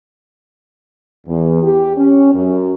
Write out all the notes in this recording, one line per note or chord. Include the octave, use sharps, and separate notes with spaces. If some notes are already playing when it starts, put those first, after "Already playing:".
E2
G4
C#4
F#2